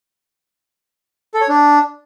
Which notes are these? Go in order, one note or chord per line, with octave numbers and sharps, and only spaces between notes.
A4
C#5
D4